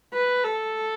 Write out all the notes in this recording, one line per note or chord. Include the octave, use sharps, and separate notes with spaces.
B4
A4